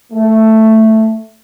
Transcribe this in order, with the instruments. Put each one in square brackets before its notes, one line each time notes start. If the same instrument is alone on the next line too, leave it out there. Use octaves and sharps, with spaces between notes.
[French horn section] A3